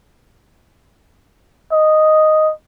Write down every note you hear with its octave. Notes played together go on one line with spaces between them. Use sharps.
D#5